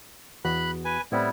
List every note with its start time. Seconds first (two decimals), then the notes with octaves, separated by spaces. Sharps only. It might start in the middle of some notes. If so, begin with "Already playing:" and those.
0.45 E2 B3 F#4 B5 F#6
0.85 B4 G#5
1.12 A2 G3 B3 C4 E4